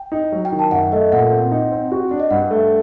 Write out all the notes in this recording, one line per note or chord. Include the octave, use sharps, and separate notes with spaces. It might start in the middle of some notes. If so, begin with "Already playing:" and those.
Already playing: G5
D#4
F#3
G5
D#3
A5
F#2 F#5
A3 D#5
A#2 F#5
C4
D#4
C4
F#4
D4
D#5
G2 F#5
A3